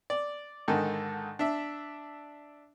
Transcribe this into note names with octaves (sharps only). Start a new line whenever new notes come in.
D5
G#2 D3 D#3 A4
D4 E5